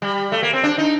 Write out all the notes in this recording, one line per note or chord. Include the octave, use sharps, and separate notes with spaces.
G3
A3
A#3
C4
D4
D#4